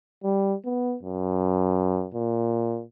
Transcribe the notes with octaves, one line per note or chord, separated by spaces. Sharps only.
G3
B3
F#2
A#2